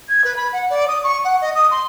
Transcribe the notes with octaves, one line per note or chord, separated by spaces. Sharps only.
G#6
B4
B5
F#5
D5
D#6
C#6
F#5
D#5
D#6
C6